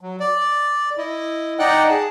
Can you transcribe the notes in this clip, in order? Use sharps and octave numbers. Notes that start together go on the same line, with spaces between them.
F#3
D5
E4 D#5
D#4 D5 D#5 F#5 G5 F#6
G#4 A5